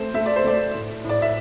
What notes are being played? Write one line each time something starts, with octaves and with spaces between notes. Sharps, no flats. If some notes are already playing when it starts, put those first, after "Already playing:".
Already playing: A3 C4 C5
A3 E5
D5
C5
A3 D5
A2
A2 D5
E5